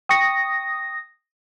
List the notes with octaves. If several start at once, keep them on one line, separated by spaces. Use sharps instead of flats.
G5 C#6 D#6 A#6 C#7